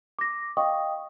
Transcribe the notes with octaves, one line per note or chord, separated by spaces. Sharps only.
D6 A#6
D#5 F5 G5 C#6 D#6